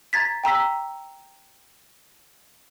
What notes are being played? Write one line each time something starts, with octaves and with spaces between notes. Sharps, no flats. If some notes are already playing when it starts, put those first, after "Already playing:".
A#5 G#6 A6 B6
G5 A#5 E6 B6